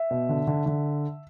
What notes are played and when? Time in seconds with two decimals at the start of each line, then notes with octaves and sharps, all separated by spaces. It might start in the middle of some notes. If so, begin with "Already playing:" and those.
Already playing: E5
0.11 B2
0.29 D3
0.47 D3
0.66 D3